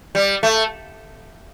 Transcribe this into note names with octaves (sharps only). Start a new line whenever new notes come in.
G3
A3